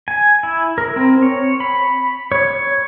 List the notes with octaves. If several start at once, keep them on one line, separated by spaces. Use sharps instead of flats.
G#5
E4
A#4
C4
C#5
B5
C#5
C#5